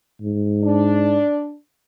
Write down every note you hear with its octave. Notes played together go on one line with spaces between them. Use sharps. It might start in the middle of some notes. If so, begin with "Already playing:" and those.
G#2
D4